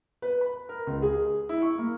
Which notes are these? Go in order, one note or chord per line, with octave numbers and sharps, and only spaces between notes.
B4
B5
A#4
C#2
G#4
E4
C#6
A#3